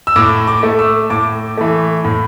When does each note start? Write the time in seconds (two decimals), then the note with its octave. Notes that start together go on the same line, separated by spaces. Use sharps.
0.07 E6
0.16 A2 D6
0.47 D6
0.63 A3
0.79 E6
1.10 A2 D6
1.57 E3 A3
2.05 A2